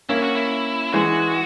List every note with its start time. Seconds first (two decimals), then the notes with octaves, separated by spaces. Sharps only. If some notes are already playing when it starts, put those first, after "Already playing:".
0.09 A#3 C#4 E4
0.22 F#4
0.35 E4
0.93 E3 G#3 F#4